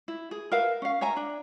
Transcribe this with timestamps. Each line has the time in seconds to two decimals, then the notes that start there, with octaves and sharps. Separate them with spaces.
0.08 E4
0.31 G#4
0.52 A#4 B4 E5 F5
0.82 C#4 F5
1.01 C#5 E5 G#5 A#5
1.16 D4